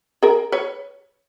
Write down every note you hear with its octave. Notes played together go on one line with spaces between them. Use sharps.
G#4 A#4
B4 C#5